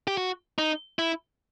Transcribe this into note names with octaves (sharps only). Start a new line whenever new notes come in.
G4
F#4
D#4
E4